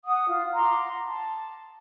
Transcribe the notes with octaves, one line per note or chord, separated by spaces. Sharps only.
F#5 D#6
F4
F#5 A#5 C6 D6
A5